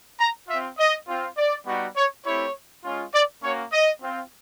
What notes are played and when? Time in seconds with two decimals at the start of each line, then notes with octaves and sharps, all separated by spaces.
0.20 A#5
0.48 C4 F4 E5
0.79 D#5
1.08 C4 F4
1.38 D5
1.67 G3 B3 D#4 F#4
1.96 C#5
2.25 A3 C4 E4 G4 C#5
2.85 G#3 C#4 F4
3.14 D5
3.43 A#3 C#4 F#4 C#5
3.72 D#5
4.02 C4 F4